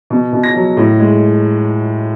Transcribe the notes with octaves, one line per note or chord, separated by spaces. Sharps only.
B2
B2
A#6
F#3
A2
G#3